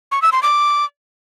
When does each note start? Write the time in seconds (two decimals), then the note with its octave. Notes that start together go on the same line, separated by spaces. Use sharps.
0.12 C#6
0.22 E6
0.32 C6
0.43 D6